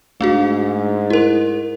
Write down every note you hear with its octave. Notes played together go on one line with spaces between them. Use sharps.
G#2 A3 D4 F#4
E4 A#4